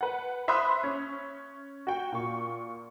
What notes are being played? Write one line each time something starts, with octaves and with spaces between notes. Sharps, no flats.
B4 F#5
C5 E5 B5 C6 D#6 F#6
C#4
F#4 G5
A#2 C#6